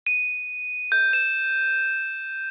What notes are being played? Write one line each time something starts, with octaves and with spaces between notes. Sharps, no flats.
D#7
G6
E7